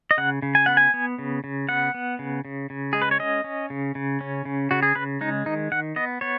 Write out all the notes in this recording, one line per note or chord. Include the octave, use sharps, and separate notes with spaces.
D#5
C#3 F#5
C#3
G#5
B3 F#5
G#5
B3
C#3
C#3
B3 F#5
B3
C#3
C#3
C#3
G#3 G#4
B4
C#5
C#4 D#5
C#4
C#3
C#3
C#4
C#3
C#3 F#4
G#4
C#3 B4
G#3 D#4
D#3 D#4
D#3 F#5
B3 D#5
B3 C#5